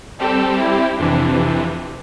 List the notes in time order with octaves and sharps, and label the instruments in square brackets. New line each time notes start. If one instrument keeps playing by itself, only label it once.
[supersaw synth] G3 C4 G4 [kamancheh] A4
[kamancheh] E4
[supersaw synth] F2 C3 E3 [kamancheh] D4